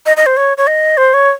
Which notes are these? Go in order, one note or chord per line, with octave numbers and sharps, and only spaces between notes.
D#5
D#5
C5
C#5
C#5
D#5
C5
C#5